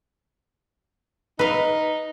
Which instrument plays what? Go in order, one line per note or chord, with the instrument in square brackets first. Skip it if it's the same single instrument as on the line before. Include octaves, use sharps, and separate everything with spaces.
[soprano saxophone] D#4 [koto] B4 F5